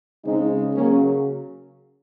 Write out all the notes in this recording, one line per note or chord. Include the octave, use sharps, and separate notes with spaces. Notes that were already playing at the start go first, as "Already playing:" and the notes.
C#3 G#3 C4 D#4
C#3 F#3 A#3 C#4